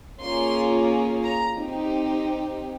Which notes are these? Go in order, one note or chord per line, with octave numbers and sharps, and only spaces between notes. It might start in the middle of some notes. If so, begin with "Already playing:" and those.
A#3 C#4 F4 G#4 C6
A#5
C4 D#4 G4